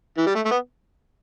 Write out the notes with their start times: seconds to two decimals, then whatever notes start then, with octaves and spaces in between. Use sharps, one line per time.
0.18 E3
0.27 G3
0.35 A3
0.46 A3
0.51 B3